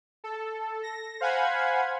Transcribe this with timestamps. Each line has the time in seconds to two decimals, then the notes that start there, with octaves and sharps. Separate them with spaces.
0.24 A4
0.83 A#6
1.20 C5 F5 F#5 G#5 B5 G#6